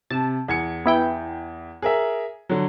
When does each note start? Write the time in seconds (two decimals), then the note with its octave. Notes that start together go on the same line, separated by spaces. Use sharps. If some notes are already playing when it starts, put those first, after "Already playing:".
0.11 C3 A5
0.48 E2 G#6 C#7
0.85 B3 E4 G5
1.82 G#4 A#4 E5
2.49 D3 F#3